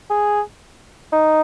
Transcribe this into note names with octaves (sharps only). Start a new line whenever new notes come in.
G#4
D#4